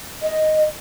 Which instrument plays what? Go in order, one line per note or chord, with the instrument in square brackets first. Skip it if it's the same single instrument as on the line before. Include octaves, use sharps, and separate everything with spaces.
[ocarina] D#5